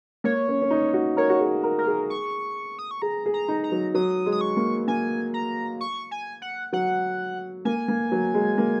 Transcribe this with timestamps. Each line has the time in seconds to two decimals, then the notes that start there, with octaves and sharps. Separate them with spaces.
0.24 A#3 C#5
0.48 C#4
0.62 C#4
0.71 D#4
0.94 F#4
1.17 A#4 C#5
1.30 F#4
1.40 G#4
1.63 A#4
1.78 A#4
1.87 G#4
2.10 C#6
2.79 D#6
2.91 C#6
3.02 G#4 A#5
3.26 G#4
3.34 A#5
3.48 D#4
3.64 A#5
3.72 F#3
3.94 F#3 D#6
4.26 G#3
4.32 D#6
4.41 C#6
4.57 A#3
4.88 A#3 G#5
5.34 A#5
5.81 C#6
6.11 G#5
6.42 F#5
6.73 F#3 F#5
7.65 A#3 G#5
7.88 A#3
8.12 F#3
8.34 G#3
8.58 A#3